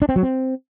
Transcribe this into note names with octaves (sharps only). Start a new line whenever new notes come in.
D4
C4
F#3
C4